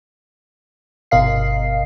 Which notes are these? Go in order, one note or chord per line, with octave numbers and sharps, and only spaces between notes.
G1 B2 A#4 D#5 F5 C7